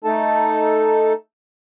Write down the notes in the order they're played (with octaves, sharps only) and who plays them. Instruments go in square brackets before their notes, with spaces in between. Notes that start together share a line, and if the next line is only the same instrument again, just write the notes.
[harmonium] A3 D#4 A4 A5